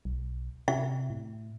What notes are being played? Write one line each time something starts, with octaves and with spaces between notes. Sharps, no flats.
B1
C3 E5
A2